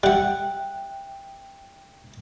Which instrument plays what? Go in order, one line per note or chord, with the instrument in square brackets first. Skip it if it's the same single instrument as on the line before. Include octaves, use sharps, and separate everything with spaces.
[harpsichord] G3 F#5 [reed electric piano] E5 G5 F#6